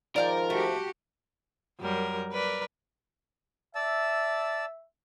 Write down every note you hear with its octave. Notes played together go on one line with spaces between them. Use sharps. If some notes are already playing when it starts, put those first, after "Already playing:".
G#2 D#3 F3 A#4 D5 F5 G5
A3 F#4 G4
F#2 G3 A#4
A#4 B4 D5
D5 E5 A5 E6